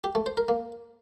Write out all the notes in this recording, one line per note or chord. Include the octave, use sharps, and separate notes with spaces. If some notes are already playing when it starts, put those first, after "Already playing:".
G4
A3
C5
A#4
A#3